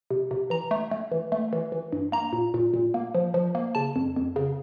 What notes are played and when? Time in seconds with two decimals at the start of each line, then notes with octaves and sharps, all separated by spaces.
0.10 C3
0.31 C3
0.50 E3 A#5
0.71 A3
0.91 A3
1.12 E3
1.32 A3
1.53 E3
1.72 E3
1.92 G2
2.12 A#3 A#5
2.33 A#2
2.54 A#2
2.74 A#2
2.94 A#3
3.15 F3
3.34 F3
3.55 A#3
3.75 C#3 A5
3.96 F2
4.16 F2
4.36 C#3